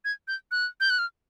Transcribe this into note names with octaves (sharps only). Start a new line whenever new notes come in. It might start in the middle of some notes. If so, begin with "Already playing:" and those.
G#6
G6
F#6
G6
F#6
F6